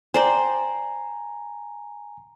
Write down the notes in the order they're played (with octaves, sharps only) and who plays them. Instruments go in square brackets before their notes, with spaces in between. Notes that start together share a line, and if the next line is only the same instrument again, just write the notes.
[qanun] C5 D5 G5 [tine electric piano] G#5 A#5